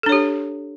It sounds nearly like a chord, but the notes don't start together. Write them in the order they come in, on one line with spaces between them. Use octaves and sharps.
A4 D4 C#5 G4